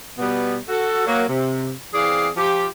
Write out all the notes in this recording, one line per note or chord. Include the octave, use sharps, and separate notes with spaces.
B2 G3 B3
F#4 A4
F#3 A#3
C3
E3 C4 G#4 D5 F5
F3 F4 G4